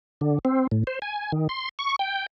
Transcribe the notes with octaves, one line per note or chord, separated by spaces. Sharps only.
D3
C4
A2
C5
G#5
D#3
C6
C#6
G5